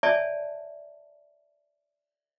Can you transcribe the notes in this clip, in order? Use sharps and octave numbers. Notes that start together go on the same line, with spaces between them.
C#5 D5 E5 G#5 A5